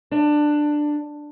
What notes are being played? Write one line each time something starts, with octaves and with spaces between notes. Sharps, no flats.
D4